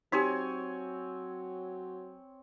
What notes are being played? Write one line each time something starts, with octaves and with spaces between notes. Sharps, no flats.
F#3 C4 D#4 G4 C#5 G#5